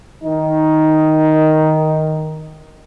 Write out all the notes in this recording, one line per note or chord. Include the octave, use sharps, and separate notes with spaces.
D#3 D#4